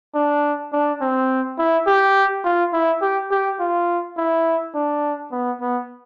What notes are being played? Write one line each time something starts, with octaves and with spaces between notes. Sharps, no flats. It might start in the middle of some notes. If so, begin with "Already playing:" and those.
D4
D4
C4
E4
G4
F4
E4
G4
G4
F4
E4
D4
B3
B3